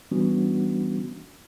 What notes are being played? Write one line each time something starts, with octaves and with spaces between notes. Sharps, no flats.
E3 G3 B3 C#4 D4 F#4